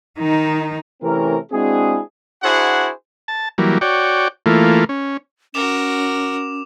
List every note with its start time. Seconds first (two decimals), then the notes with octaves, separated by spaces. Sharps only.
0.18 D#3 D#4
1.03 C3 E3 A3 C4 C#4 A#4
1.52 G#3 C4 D4 E4 F#4 G#4
2.43 D4 E4 F#4 G#4 C5 F#5
3.28 A5
3.58 E3 F#3 G3 A#3
3.81 F#4 C#5 D5 G5
4.46 E3 A3 A#3 F4
4.89 C#4
5.54 C#4 F#4 A#4 D6 E7